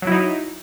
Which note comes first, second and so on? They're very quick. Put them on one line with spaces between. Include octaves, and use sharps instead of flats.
F#3 E4 D#4